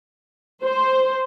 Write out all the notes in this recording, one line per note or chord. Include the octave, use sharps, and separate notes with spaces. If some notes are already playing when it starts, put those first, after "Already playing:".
C5